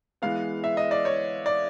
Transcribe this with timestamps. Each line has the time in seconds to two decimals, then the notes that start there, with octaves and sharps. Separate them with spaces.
0.22 E3 G#3 B3 F5
0.64 E5
0.77 D#5
0.91 D5
1.05 C#5
1.46 D5